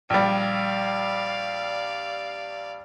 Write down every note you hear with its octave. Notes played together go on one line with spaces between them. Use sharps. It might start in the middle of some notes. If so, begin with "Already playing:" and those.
A#1 G3 D5 F5